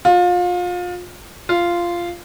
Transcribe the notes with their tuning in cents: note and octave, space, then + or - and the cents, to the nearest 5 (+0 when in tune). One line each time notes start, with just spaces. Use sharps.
F4 +30
F4 -10